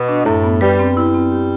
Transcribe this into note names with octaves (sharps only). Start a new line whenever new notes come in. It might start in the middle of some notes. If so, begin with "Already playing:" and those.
Already playing: B2
D4
F#2 A2
B3
G3 B4
C4
G3 E4
C4
G4